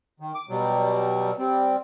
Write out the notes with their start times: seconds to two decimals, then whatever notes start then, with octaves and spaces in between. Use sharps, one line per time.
0.20 D#3
0.35 D6
0.49 B2 F#3 G3
1.38 G3 C4